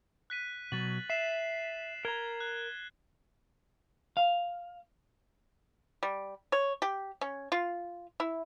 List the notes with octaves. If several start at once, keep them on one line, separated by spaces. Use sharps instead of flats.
F#6 B6 D#7
B2 F#3 A6 F#7
E5 C7 E7
A#4 A#5 G#6 G7
F#6
F5
G3
C#5
G4
C#4
F4
E4